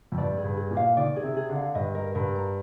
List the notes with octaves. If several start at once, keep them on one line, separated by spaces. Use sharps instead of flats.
F2
G2 D5
G#4
G2
G#4
A#2
F5
D#3 D5
G#4
C3
G#4
D3
F5
G2 D#5
A#4
G2 A#4
A#5